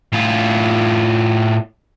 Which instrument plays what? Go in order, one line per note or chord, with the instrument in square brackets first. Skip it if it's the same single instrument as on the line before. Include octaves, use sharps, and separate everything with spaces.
[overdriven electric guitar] A2 F4